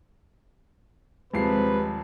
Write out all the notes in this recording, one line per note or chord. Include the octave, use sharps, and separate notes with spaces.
D#1 C3 F3 G#3 B4 C7